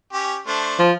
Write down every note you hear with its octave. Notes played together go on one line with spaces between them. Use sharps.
C#4 G4
A3 D4 C5
F3